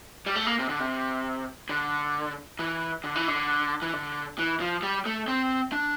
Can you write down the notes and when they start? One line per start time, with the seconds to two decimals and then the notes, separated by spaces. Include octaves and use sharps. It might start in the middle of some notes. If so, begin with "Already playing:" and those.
0.26 G3
0.36 A3
0.47 A#3
0.59 C3
0.69 D3
0.80 C3
1.69 D3
2.59 E3
3.04 D3
3.15 E3
3.28 D3
3.82 E3
3.93 D3
4.39 E3
4.60 F3
4.83 G3
5.06 A3
5.28 C4
5.72 D4